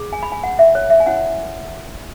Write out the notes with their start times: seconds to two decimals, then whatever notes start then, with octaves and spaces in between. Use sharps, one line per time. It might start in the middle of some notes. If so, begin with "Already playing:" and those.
Already playing: G#4
0.13 G#5
0.23 B5
0.32 G#5
0.43 F#5
0.59 E5
0.75 C#5
0.90 E5
1.00 G#5
1.06 C#4 E4 C#5 F#5